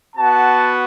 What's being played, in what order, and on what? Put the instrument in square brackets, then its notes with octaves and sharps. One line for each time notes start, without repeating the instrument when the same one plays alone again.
[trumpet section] B3 F#4 A5